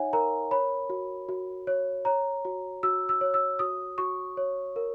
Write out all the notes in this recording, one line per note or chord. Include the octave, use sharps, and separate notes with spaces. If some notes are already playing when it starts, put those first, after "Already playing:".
Already playing: D#4 C#5 E5 F#5 G#5
A#4 A#5
C#5 B5
F#4
F#4
C#5
C#5 A#5
F#4
F#4 E6
E6
C#5
E6
F#4 D#6
F#4 C#6
C#5
A#4